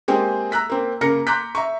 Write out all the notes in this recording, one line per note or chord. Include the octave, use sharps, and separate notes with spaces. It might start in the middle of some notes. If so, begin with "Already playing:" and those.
G#3 A#3 C4 G4 G#4
A#5 E6 F#6 B6
A#3 C4
C#3 A#3 A#4 A#6 C#7
A#5 C6 D6 F#6 G6 B6
E5 A#5 C#6